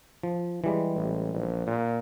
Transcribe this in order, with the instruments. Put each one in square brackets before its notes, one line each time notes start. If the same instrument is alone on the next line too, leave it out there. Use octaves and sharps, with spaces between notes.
[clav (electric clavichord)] F3
E3 G3 G#3
[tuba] A1
A#1
A#2